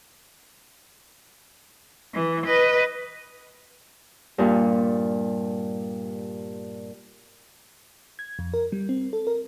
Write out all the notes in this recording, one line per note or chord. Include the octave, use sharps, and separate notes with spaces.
E3
B4 D#5
G2 A#2
G#6
F2
A#4
G3
C4
A4
A#4